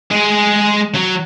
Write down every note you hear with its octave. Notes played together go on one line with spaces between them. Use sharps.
G#3 G#4
F#3